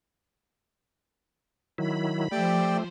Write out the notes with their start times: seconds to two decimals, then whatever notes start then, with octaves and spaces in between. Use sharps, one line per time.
1.78 D#3 F#3 E4 B5
2.32 F3 A3 G4 C5 D5 G5